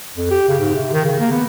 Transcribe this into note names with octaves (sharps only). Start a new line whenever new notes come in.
F2
G4
C#3
G#2
C3
D#3
C#3
A#3
B3